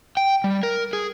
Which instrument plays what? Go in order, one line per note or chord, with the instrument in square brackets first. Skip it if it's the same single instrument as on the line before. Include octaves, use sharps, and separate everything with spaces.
[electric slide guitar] G5
G3
A#4
G#4